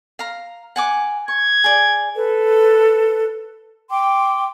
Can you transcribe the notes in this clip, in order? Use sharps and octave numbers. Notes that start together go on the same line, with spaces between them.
F5 A#5
F#5 G#5 D6
C#6 G#6
G#4 D5
A4 B4
G5 C6 D6